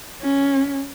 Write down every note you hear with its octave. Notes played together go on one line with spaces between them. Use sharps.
C#4